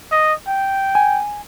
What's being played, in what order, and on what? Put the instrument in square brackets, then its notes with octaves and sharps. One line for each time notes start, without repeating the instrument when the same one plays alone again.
[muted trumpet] D#5
G5
[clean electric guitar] G#5